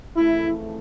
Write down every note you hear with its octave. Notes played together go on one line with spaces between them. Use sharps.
F2 C#3 E3 A3 E4